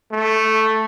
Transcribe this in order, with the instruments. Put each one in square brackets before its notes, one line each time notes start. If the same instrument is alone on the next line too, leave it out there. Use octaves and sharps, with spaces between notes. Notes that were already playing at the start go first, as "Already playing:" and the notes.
[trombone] A3